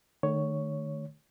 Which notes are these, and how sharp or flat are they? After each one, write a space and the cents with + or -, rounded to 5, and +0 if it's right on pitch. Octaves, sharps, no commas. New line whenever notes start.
D#3 -40 A3 +0 C#5 +5